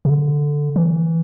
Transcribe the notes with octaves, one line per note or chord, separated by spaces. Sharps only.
C3
D3
E3